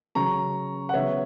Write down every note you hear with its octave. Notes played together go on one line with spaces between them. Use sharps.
C#3 F#3 C#4 A#5 C#6
F#5
C#3 F#3 B3 C#5 E5